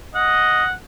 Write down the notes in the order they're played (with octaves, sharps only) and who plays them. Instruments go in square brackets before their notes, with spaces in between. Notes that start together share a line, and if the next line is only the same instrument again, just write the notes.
[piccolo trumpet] D#5 [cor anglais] F#5